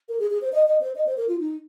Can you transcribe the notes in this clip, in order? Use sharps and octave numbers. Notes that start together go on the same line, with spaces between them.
A#4
G#4
G#4
C5
D#5
D#5
C5
D#5
C5
A#4
F4
D#4